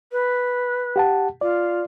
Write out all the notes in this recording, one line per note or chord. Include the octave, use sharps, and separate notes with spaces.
B4
G4 F#5 A5
F4 D5